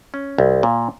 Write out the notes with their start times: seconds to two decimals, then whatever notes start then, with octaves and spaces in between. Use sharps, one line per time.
0.14 C#4
0.38 C2
0.63 A#2